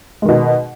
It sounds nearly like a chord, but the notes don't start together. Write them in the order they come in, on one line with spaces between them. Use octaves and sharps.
G#3 D#3 B2